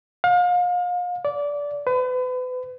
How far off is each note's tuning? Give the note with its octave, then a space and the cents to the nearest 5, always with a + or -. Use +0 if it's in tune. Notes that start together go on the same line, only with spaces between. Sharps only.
F5 +35
D5 -20
B4 +35